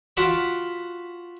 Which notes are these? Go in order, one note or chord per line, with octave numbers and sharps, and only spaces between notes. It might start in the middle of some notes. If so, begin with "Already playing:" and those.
F4 F#4 F#5 A5 B5 D6